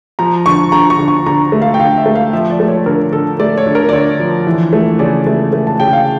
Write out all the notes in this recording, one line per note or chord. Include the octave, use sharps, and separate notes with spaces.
F3 A#5
D3 C#6
D3 A#5
C#6
D3
C#6
D3 A#5
A3
F5
G5
D3 F5
E5
A3
F5
F3 E5
D5
A3
C#5
D3 A#4
D3 A4
A3 D5
C#5
D3
A#4
D5
D3 C#5
F3
E3
A3
C#3 D5
A3
A3
A5
C#3 G5
F5